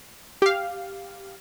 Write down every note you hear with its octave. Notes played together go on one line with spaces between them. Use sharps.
G4 F5